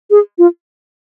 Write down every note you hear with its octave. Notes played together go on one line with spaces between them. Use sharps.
G#4
F4